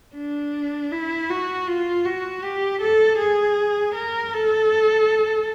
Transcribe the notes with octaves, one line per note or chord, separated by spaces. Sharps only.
D4
E4
F#4
F4
F#4
G4
A4
G#4
A#4
A4